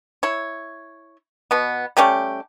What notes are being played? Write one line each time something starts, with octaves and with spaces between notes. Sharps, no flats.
E4 C#5
B2 B3
G3 A3 C#4 G4